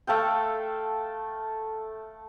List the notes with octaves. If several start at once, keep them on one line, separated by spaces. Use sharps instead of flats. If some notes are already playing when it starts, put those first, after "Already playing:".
A3 A4 F5 G5